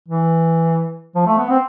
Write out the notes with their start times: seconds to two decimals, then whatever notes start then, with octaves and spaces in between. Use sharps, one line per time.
0.08 E3
1.15 F3
1.26 A3
1.38 B3
1.50 C4